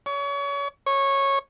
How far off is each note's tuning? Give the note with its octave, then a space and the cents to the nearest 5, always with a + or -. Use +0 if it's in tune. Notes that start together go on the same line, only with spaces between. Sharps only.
C#5 +30
C#5 -15